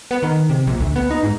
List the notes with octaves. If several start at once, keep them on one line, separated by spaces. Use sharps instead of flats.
B3
D#3
C3
A#1
D2
B3
D#4
G#2